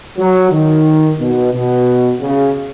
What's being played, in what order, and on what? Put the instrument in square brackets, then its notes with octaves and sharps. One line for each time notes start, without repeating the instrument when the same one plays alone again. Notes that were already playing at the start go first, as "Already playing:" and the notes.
[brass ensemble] F#3
D#3
B2
B2
C#3